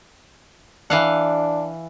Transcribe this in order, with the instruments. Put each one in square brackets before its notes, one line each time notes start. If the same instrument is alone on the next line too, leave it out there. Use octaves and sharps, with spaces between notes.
[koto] E3 F5 F#5 [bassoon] D4